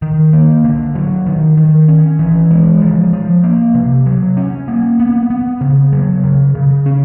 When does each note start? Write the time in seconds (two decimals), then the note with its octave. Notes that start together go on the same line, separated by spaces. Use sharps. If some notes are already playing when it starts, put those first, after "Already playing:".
0.02 D#3
0.33 A#3
0.64 D3
0.95 F#3
1.26 D#3
1.57 D#3
1.88 C#4
2.19 E3
2.51 G#3
2.81 F3
3.13 F3
3.44 A#3
3.74 C3
4.06 F#3
4.37 C#4
4.68 A#3
5.00 B3
5.30 B3
5.61 C#3
5.93 F#3
6.24 C#3
6.55 C#3
6.86 C#4